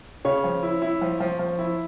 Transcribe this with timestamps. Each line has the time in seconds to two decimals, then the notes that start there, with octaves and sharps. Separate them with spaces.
0.25 C#3 C#5
0.44 F3
0.63 E4
0.82 E4
1.02 F3
1.20 F3
1.39 F3
1.59 E4